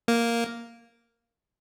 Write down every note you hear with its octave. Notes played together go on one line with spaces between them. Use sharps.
A#3